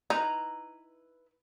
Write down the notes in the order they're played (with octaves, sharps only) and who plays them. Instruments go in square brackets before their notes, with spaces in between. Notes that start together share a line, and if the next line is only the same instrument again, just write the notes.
[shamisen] D#4 [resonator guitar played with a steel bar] E4 B4 A#5